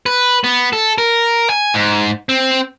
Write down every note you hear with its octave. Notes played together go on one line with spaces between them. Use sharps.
B4
B3
A4
A#4
G#5
G#2
C4